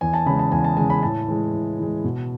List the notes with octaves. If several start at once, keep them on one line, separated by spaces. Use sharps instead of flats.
E2 G#5
A5
C#3 G#3 B5
A5
E2 G#5
A5
C#3 G#3 G#5
B5
A2 A5
E3 G#3
A2
E3 G#3
B2